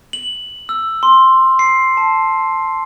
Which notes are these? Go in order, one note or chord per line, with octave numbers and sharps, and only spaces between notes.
F#7
E6
C6
C7
A5